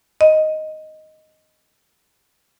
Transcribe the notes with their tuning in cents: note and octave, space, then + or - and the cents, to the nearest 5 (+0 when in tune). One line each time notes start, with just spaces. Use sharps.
D#5 +0